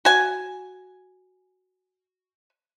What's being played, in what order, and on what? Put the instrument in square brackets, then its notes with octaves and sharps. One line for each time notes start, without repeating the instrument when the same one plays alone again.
[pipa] F#4 G#5